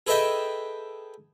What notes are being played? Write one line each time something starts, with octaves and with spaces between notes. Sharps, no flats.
G#4 A4 B4 D#5 E5 G5